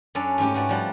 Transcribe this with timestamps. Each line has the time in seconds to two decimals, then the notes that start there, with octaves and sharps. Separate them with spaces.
0.15 F#2 C#4 D4 A4 D5
0.38 G#2 A3 C#4 G4
0.54 G#2 A3 F#4 B4 D5
0.69 F3 G3 F#5 A5